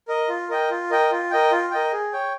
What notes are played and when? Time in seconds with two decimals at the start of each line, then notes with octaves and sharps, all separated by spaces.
0.08 A#4 D#5
0.29 F4
0.50 A#4 D#5 G5
0.70 F4
0.90 A#4 D#5 G5
1.11 F4
1.31 A#4 D#5 G5
1.52 F4
1.71 A#4 D#5 G5
1.92 G#4
2.13 C#5 G5